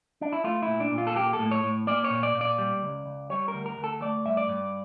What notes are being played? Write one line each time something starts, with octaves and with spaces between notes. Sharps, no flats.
D4
E4
A3 F4
E4
A#2
D4
A#2
F4
A4
A#3 G4
A4
A2
C#5
A2
A#3 D5
C#5
A#2
D5
A#2
D5
G3
C#2
C#2
G3 C#5
A#4
D2
A#4
D2
A4
A3 D5
G2 E5
D5
G2